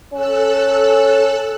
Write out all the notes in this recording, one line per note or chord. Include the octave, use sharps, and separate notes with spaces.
C#4 A4 E6 F#6